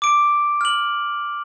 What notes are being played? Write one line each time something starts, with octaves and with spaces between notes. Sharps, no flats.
D6 D7
F6 F#7